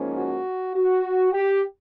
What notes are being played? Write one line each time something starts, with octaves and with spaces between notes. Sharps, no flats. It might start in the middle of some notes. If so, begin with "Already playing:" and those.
Already playing: G#2 F3 A#3 C#4
F#4
F#4
G4